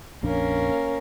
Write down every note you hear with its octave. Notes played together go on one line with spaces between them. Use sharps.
A#1 F2 A#3 C#4 D4